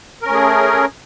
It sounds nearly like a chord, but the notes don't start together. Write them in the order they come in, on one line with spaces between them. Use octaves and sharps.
A#4 C#4 A3 G#4